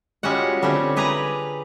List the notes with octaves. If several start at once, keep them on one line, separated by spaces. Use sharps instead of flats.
G3 G#3 C#4 F4 F#4 F#5
D3 G3 A3 C4 C#4
G4 G#4 B4 D5 A#5